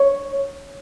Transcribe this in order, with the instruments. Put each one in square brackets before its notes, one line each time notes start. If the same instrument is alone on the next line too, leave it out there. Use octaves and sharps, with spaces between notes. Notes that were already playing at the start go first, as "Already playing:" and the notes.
Already playing: [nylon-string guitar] C#5